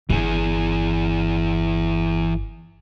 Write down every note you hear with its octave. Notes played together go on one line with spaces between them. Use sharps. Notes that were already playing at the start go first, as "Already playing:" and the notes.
G1 E3 G#4